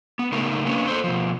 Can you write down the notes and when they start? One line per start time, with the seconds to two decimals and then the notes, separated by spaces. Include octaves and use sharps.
0.19 B3
0.32 C#3 A3 D#4 A#4
0.66 A#3 B3 C#4 D4
0.88 A4 C5
1.04 B2 F3